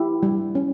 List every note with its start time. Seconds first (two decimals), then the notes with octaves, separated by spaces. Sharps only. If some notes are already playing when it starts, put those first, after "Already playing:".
Already playing: E4 G4
0.23 G3
0.55 C#4